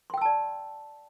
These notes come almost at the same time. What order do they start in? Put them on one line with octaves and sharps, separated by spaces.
C6 G5 E6 A5 D5